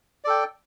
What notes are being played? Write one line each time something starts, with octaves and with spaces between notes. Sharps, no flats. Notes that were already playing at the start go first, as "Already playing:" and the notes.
A4 D5 G5